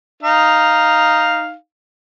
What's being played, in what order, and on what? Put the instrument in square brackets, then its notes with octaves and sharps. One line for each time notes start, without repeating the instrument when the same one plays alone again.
[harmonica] D#4 F5